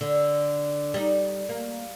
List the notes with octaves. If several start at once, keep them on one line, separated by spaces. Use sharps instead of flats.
D3
G3 D#4
A#3